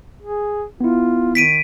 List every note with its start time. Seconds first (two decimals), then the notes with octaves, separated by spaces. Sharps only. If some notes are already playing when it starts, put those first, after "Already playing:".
0.22 G#4
0.81 B3 E4 F4
1.35 D#3 B6 D7 D#7